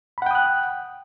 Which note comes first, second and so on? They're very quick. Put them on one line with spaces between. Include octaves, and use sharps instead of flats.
B5 F#5 G5 D#6 F#6